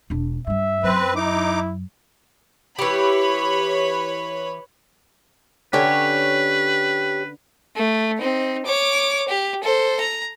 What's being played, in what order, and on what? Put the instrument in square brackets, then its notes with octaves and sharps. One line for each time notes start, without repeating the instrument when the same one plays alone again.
[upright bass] E1 D4
[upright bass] G2 G3 [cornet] E5
[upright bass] F#2 F#3 [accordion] C4 B4
[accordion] D#4 D6 [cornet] E4
[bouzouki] E3 G4 [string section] B4 C#5 B5
[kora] D3 C#4 [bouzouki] G4 C#5 [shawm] B4
[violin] A3
C4 D#4
C#5 D6
G4
A4 C5
A#5